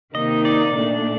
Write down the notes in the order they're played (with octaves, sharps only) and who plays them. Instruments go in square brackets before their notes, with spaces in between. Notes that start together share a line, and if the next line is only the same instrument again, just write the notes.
[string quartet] C3 D#3 A#3 D#4 [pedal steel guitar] D#5
[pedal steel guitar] D5
[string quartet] A#2 A3 D4